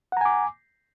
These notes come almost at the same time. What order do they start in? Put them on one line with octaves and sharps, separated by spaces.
F#5 A#5 G#5 D6